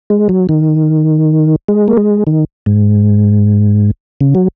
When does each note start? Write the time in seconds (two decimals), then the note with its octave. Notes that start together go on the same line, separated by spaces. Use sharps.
0.10 G#3
0.29 F#3
0.49 D#3
1.68 G#3
1.88 A#3
1.97 G#3
2.27 D#3
2.66 G#2
4.21 C#3
4.35 F#3